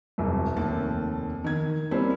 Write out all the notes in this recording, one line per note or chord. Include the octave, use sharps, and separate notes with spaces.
E1 C2 F#2
F1 D#2 A5
D#3 G#6
G3 A#3 C4 C#4 E4 C5